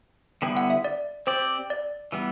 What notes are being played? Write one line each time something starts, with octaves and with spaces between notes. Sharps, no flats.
D3 G3 B3 E4 G5
F#5
E5
D5
C4 G4 C5 D5
D5
E3 G3 B3